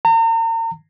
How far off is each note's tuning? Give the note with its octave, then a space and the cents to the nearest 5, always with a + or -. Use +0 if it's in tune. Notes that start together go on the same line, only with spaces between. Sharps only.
A#5 -40